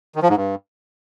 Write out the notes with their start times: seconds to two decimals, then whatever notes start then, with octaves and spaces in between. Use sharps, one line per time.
0.15 D#3
0.23 F3
0.30 G#2
0.37 G2